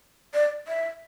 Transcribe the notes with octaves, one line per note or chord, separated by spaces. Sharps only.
D5
E5